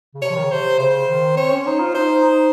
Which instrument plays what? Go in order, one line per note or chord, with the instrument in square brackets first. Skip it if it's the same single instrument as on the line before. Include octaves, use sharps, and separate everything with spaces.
[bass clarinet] C#3
[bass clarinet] C3 [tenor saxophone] C#5
[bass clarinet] F3
D#3
C#3
[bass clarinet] C3 [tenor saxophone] C5
[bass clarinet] C#3 [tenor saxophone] C5
[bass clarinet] D#3
[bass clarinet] C4 [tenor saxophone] C#5
[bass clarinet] C#4
[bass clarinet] D#4 [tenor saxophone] C5
[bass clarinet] F4
[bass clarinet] D#4 [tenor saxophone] C5
[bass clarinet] D#4